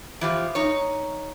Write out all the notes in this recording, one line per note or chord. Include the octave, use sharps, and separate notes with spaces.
E3 F3 G4
D#4 C#5